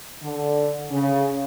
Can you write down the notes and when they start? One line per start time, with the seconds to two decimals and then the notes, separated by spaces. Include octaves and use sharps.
0.23 D3
0.91 C#3